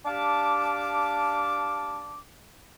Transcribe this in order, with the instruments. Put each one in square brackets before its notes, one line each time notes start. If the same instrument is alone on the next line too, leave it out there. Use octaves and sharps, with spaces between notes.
[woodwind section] D4 G4 F5 A5 D6